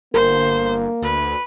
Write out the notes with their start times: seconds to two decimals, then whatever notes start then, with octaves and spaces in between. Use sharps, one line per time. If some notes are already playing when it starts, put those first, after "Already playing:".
0.14 G1 A#3 A#4 C5
1.02 D2 B4